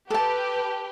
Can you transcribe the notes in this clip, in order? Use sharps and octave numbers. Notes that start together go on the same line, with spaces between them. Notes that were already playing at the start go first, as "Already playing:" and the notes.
G4 A4 B4 A5